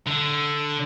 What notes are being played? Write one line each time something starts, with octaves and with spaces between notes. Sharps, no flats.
D3